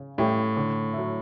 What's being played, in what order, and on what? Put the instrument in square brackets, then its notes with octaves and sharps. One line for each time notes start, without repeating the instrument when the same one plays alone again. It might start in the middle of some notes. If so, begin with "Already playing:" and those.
Already playing: [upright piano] C#3
[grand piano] A2 [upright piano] G3 C#4 E4 G4
[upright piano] D3
F#3 A3